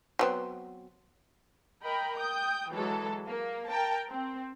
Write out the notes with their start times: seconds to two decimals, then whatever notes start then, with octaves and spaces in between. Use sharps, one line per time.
0.19 F#3 B3 C4
1.83 A#4 D#5 G5 B5
2.18 G5 D#6 G6
2.71 E3 F#3 G#3 A4
3.27 A#3
3.68 A#4 G5 A5
4.10 C4